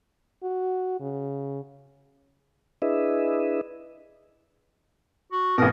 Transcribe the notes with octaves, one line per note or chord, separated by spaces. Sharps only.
F#4
C#3
D4 E4 G#4 B4 D#5 E5
F#4
A1 B2 A#4